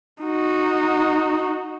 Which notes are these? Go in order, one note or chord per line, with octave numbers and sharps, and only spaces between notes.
D#4 F#4